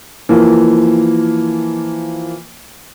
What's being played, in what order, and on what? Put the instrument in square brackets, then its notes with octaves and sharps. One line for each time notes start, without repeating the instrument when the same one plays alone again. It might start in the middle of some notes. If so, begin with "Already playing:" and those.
[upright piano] E3 F3 A#3